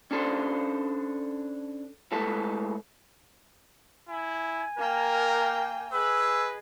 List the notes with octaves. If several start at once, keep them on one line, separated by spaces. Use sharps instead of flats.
C#4 D4 A4 C5
A2 G#3 A4 B4 C#5 A5
E4 G#5
A#3 A#4 G5
G#4 B4 D#5 G#5 E6